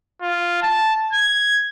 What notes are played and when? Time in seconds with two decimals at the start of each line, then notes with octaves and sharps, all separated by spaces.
0.22 F4
0.62 A5
1.13 G#6